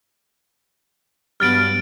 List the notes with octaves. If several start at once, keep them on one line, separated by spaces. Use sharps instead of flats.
G2 F#3 B3 F6 A6 D7